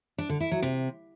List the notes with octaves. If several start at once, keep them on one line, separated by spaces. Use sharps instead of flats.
D4
D3
E4
F#3
C3